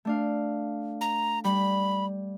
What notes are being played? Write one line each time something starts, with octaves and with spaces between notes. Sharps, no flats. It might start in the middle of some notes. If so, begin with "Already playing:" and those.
A3 D4 F5
A#5
G3 B5